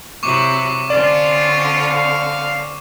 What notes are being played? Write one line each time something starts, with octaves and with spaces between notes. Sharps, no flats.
C3 F#3 E4 C#6 D6
D3 C4 C#4 F4 D5
F5